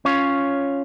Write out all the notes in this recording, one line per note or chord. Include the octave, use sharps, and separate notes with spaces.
C#4 F4 C#5